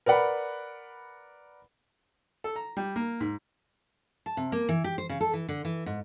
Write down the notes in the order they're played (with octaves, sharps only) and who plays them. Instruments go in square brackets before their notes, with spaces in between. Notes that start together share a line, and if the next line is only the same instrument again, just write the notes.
[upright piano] A#4 B4 D5 F#5 B5
[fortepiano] A4
A#5
G3
A#3
G#2
[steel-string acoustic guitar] A5
C3
A#3
E3
G4
C5
C#3
A4
E3
D3
E3
G#2